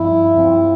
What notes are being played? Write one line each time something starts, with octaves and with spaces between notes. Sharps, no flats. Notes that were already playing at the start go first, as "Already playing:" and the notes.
Already playing: G2 F3 C4 E4
G2 F3 C4